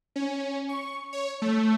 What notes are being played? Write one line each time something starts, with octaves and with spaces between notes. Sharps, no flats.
C#4
C#6
C#5
A3